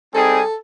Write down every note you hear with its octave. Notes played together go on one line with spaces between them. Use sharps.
G3 C4 D#4 G#4 A4